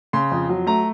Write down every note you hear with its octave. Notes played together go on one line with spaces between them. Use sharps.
C#3 C6
F2
F#3
A3 A#5